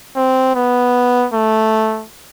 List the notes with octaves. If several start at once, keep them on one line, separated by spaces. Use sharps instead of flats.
C4
B3
A3